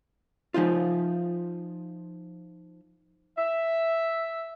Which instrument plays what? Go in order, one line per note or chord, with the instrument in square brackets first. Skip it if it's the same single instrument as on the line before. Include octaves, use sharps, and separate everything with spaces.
[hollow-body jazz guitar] F3 C#4 D#4 F4
[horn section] E5